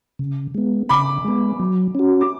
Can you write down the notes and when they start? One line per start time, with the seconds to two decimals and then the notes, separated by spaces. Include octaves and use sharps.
0.19 C#3
0.55 G#3 B3
0.89 C#3 B5 D6
1.24 G#3 B3
1.60 F#3
1.95 C#4 F#4
2.21 D6